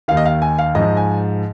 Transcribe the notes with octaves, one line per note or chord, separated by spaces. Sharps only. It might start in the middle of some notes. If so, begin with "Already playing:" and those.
D#2 D#3 F5
D#5
F5
G#5
F5
G#2 F3 D#5
G#5